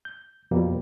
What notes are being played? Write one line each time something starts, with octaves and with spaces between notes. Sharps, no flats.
G6
F2 B2 F3 G3 A#3